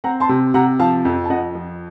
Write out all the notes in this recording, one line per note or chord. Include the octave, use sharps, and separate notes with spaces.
C4 F#5 A#5
A5 C6
C3
C3 F#5 A#5
F3 F5 A5
F2
A5
F2 D#5 F#5
F3